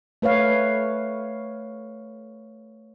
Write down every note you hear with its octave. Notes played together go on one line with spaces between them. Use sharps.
A3 B4 C#5 F5